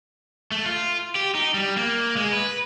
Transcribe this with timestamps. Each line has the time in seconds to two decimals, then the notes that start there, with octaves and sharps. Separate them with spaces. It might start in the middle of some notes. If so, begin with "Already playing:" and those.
0.52 A3
0.66 F4
1.15 G4
1.35 D#4
1.54 G3
1.77 A#3
2.16 G#3
2.33 B4